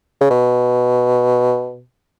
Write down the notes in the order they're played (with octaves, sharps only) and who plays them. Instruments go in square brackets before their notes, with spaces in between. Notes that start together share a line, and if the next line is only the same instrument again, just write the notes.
[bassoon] C#3
B2